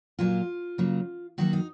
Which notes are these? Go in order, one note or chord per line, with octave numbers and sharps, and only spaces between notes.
A#2 F#3 A#3 F4
C#3 F#3 A#3
D#3 F#3 A#3 F#4
D#4